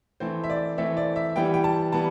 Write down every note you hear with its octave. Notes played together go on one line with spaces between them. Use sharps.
E3 A3 C4 C5
E5
D5
E3 A3 C4 E5
D5
E5
E3 G3 B3 G5
G5
A5
E3 G3 B3 A5